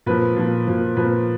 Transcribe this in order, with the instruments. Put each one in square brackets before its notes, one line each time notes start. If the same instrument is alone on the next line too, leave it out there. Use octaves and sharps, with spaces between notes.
[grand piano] A#2 F3 B4
A#2 F3
A#2 F3
A#2 F3 B4